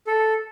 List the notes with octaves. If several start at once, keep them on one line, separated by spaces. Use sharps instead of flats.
A4